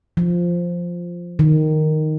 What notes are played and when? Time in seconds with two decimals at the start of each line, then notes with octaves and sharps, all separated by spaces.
0.17 F3
1.39 D#3